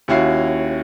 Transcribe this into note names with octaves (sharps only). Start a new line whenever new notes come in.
D#2 C#4 E4 F#4 F5 C7